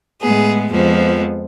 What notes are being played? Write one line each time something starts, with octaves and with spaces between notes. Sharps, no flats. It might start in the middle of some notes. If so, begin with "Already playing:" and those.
A2 G#3 B3 G#4
F2 F3 G#3 B3